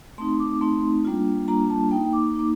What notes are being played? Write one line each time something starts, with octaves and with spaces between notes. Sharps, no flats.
A3 C4 D#4 C6
D6
A3 C4 D#4 C6
G3 A#3 D4 F4
G3 A#3 D4 F4 A#5
A5
A#3 D#4 G5
D6
A#3 D#4